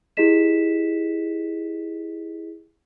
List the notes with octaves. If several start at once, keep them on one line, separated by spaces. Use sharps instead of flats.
E4 G4 G#4 D#5 B6 E7